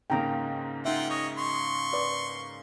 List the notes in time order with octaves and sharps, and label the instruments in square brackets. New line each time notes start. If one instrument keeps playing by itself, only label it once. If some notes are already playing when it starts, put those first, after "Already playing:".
[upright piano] G#2 C#3 A#3 [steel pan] G5 A#5
[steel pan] D#4 E5 [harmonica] F4 F#5 G5
[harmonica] C#5 D#5
C6 C#6
[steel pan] B4 D5